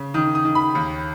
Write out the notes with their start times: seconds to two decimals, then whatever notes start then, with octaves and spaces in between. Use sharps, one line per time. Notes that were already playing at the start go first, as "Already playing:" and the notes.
Already playing: C#3
0.14 D#3 D#6
0.35 D#6
0.45 D#3
0.55 B5
0.75 D#2